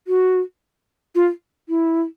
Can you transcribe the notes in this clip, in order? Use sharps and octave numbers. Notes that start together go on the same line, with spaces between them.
F#4
F4
E4